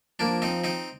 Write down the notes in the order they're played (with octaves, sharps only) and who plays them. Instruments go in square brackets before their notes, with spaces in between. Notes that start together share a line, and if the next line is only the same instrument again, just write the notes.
[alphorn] F3 [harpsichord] A#3 D4
[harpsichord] C4 D#4
C4 D#4